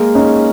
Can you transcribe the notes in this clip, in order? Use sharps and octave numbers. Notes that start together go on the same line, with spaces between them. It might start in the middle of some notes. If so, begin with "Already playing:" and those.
Already playing: G#3 A#3
C#4 D#4